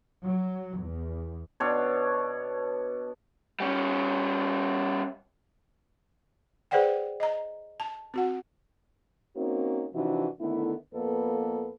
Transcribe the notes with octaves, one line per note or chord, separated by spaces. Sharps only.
F#3
E2
B2 D4 C#5
G3 C#4
G#4 B4 C5 D5 F#5 G5
D#5 A#5
A5
C4 F#4 F#5
A#3 C4 C#4 D#4 F#4
C3 E3 F3 D4 D#4 F#4
D3 D#3 A3 B3 E4
F2 A#3 B3 A4 B4